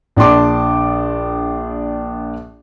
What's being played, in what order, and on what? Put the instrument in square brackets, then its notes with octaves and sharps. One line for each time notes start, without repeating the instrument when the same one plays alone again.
[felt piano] A#1 D4 A5 C6 D6